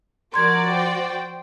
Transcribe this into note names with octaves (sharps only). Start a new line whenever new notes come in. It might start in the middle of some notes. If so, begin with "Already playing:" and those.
F3 F#4 A#4 D5 C6 G#6
C5 G5